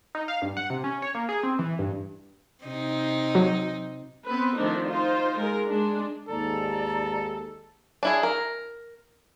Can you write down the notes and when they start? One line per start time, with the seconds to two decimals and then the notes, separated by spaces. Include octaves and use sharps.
0.15 D#4
0.28 F5
0.42 G2
0.57 F#5
0.70 C3
0.84 C#4
1.02 C#5
1.15 A#3
1.29 G#4
1.43 C4
1.59 E3
1.79 G2
2.64 C3 D#4
3.35 F#3
4.25 B3 C4 B4
4.57 D#3 F3 A3 C4 D4 D#4
4.88 D#4 F4 C5
5.37 G#3 A#4
5.67 G#3 D4
6.28 D#2 G#2 A4 D5 A#5
8.03 D4 E4 G#4
8.23 A#4